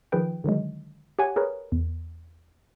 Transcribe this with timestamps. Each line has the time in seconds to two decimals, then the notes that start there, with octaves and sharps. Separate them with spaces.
0.12 D#3 F3 G#4 B4 G5
0.44 D3 D#3 F#3 G#3
1.19 G4 C#5 F#5 G#5 G#6
1.36 G#4 A#4 B4 C#5
1.72 E2